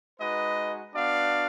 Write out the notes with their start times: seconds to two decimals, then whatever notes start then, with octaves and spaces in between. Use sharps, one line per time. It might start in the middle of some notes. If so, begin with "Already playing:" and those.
0.18 G#3 D#4 F#4 B4 D#5
0.95 B3 D4 F#4 D5 F5